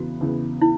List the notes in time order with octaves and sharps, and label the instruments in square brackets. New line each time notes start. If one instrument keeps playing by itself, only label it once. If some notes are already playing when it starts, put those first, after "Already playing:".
Already playing: [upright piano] E2 C#3 E3 B3 [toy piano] F#4
[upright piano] E2 C#3 E3 B3
[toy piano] E4